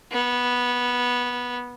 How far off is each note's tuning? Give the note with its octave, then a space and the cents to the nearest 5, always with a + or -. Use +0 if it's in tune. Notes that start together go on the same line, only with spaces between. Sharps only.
B3 -10